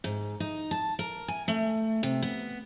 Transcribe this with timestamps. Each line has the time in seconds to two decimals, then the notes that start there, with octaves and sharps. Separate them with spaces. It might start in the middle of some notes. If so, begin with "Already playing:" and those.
0.04 G#2
0.40 D#4
0.71 A5
0.99 A#4
1.28 G#5
1.48 A3
2.03 C3
2.22 B3